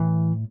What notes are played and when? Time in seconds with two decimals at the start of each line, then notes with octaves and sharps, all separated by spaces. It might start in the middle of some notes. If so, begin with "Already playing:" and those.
Already playing: A2 E3